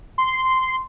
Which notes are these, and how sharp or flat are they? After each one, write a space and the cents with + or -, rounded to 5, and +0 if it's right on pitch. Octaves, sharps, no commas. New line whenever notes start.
C6 -10